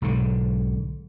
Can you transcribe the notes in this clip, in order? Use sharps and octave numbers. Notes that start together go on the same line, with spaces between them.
B1 G#2 D3